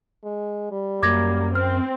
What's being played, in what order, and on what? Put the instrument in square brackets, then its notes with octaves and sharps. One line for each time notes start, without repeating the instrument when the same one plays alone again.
[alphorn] G#3
G3
[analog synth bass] F#2 [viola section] A#3 [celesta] D6 G#6 A#6
[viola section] C4 [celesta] F6